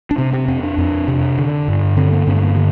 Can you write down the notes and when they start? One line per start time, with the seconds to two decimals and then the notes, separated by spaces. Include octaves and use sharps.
0.11 D4
0.18 C3 C4
0.33 C4
0.48 F2 C4
0.63 D4
0.78 F2
1.08 C3
1.38 D3
1.68 G2
1.97 D3 C4
2.12 A#3
2.27 G2 C4
2.36 A3
2.42 A#3
2.57 D3